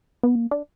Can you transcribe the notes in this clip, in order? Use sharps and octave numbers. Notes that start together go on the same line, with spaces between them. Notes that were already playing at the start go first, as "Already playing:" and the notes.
B3
A#3
D4